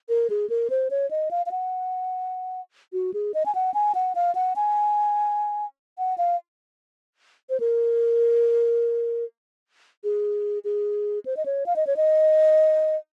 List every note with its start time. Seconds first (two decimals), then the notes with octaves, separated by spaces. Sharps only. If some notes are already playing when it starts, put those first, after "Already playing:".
0.09 A#4
0.30 G#4
0.50 A#4
0.70 C5
0.91 C#5
1.11 D#5
1.31 F5
1.46 F5
1.51 F#5
2.93 F#4
3.14 G#4
3.34 D#5
3.46 G#5
3.55 F#5
3.74 G#5
3.95 F#5
4.15 F5
4.35 F#5
4.56 G#5
5.98 F#5
6.18 F5
7.50 C5
7.60 A#4
10.04 G#4
10.64 G#4
11.26 C5
11.37 D#5
11.46 C#5
11.66 F5
11.76 D#5
11.87 C#5
11.97 D#5